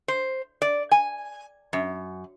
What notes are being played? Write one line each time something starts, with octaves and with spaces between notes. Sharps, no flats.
C5
D5
G#5
F#2